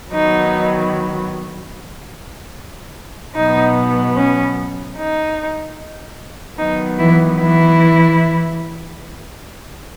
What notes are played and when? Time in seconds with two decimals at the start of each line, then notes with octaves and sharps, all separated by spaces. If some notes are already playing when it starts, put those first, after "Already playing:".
0.13 D#3 F#3 B3 D#4
3.35 B2 F#3 B3 D#4
4.16 C#4
4.98 D#4
6.58 D#3 F#3 B3 D#4
6.99 E3 E4
7.39 E3 E4